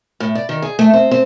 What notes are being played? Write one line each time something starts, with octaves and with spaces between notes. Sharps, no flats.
A2
D5
D#3
G#4
A3
C4
C4